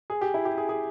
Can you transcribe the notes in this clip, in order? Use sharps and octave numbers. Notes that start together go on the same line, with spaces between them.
G#4
G4
E4
G4
G#4
G#4